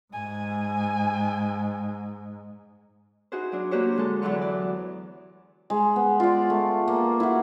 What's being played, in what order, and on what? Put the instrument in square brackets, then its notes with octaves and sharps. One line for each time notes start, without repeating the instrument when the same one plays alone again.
[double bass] G#2 [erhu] G#5
[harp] D#4 E4 F#4 G#4 C5
F#3 D4
A#3 D4 F#4 G4 C5 C#5
D3 G#3 A4
E2 D3 E3 F#3 C#6
D5
[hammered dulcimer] G#3
B3
F4 D5
A3
A#3
E4 F#4